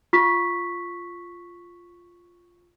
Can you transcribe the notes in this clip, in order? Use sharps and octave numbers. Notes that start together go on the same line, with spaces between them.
F4 C#6 B6